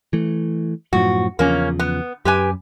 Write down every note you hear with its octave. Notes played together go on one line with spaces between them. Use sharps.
E3 A3
F#2 A2 F3 F#4
E2 C#3 F3 A#3 C#4
B3
F#2 G4 B4 G#5